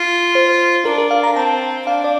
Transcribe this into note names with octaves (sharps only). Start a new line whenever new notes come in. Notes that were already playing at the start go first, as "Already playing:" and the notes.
Already playing: F4
C5
D4 A#4
A#4
F5
A#5
C4 A5
D4 F5
D5